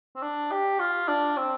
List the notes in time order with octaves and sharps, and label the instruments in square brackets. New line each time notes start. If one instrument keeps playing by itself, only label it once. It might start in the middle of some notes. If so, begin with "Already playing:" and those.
[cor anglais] C4
D4
G4
F4
D4
C4